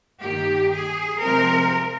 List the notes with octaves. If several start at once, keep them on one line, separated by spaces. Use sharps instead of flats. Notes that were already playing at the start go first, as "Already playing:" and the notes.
G2 D#3 A#3 G4
G#4
C3 F3 G#3 C4 A#4